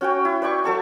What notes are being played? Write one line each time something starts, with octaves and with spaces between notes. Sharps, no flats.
C#4 F#4 C#5 G5
E4
B4 D5 G5 C#6
F#3 A4 A5 C#6